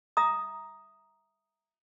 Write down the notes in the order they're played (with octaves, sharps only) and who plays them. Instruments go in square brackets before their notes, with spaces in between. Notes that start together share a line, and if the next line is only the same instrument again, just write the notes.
[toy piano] E5 A#5 D#6